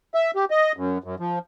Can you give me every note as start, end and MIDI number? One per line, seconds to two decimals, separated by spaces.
0.14 0.31 76
0.36 0.45 67
0.51 0.72 75
0.77 0.98 42
1.04 1.15 42
1.20 1.39 53